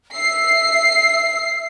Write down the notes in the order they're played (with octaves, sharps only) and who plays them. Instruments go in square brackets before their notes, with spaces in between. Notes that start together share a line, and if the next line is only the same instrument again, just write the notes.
[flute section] E5 E6 [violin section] C7